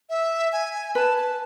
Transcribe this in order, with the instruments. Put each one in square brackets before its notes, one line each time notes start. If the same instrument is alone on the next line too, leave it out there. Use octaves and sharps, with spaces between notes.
[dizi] E5
G#5
[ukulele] B4 [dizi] A5
[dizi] A5